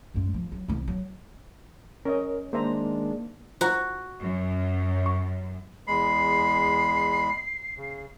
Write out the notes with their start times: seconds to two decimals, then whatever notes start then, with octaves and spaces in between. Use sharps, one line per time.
0.14 F#2 G#3
0.34 F3
0.52 F#3
0.68 C2 D#3
0.88 F#3
2.05 C#4 A#4 D#5
2.53 D#3 G#3 A#3 D4 C5 E5 A#5
3.61 F4 F#4 C5 A#5
4.20 F#2
5.06 C#6
5.87 E2 G#3 B5 C7
7.77 C#3